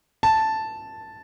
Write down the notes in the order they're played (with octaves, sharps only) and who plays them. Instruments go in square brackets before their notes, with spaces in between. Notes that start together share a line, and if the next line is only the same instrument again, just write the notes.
[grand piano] A5